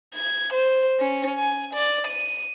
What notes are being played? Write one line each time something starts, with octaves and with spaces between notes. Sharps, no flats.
G#6
C5
C#4
G#5
D5
D#7